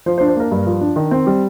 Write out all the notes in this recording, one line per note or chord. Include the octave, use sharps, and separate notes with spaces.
F3 C5
C5
D4
C5
A#3 A#4
G2
F3
D4
D#3
C4
G3